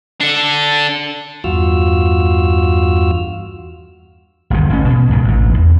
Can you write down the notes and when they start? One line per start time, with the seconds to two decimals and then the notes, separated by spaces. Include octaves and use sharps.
0.21 D4 A4
1.44 E2 G2 F4 F#4 E6 F6
4.50 G1 D#2 C3
4.70 A1 C#4
4.89 B2
5.08 C#2 G#2 D#3
5.24 A1 G#2
5.54 E2